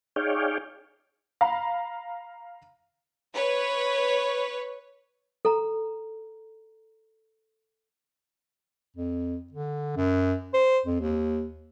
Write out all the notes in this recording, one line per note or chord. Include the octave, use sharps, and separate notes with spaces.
D#4 G#4 C#5 D5 F5 G5
F5 A#5 B5
B4 C#5
A4 A#5
F2
D3
F#2
C5
F2
D#2